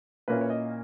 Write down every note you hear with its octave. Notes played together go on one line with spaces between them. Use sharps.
A#2 A#3 C#4 E4 B4
C#5
D#5